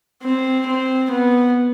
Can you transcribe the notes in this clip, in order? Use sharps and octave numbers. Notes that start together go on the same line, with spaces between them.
C4
C4
B3